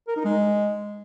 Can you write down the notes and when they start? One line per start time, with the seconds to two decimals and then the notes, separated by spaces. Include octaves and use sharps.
0.08 A#4
0.16 D#4
0.25 G#3